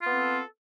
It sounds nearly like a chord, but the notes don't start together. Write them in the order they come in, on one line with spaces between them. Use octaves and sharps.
F4 B3 C4 A4